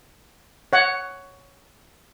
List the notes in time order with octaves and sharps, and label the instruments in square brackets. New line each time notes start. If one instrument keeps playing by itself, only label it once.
[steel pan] C#5 F#5